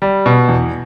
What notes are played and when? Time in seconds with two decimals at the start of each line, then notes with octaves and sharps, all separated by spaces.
0.02 G3
0.26 B2
0.48 E2